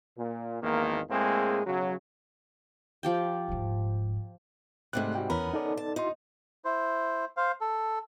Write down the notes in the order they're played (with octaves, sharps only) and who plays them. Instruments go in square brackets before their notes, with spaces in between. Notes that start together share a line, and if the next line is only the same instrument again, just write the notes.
[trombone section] A#2
G#1 E2 D#3 A#3
A2 G#3 A#3 C4 G#4
B1 C#3 F#3
[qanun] F3 G4 G5
[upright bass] D#1 G#2
[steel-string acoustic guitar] G#2 C3 G3 [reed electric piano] A3 F#6
[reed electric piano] F#4 G5
[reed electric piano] E2 E3 B5 [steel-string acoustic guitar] B3 C#4 A#4
[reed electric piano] D#4 A4 D5
[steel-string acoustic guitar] A5
[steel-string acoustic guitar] D#4 [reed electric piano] E4 F#4 C6
[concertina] E4 C5
C5 F5
A4